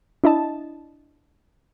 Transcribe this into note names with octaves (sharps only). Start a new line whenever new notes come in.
D4 E4 D#5 A5